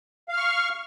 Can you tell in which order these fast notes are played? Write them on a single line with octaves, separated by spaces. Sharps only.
F5 F6 C#6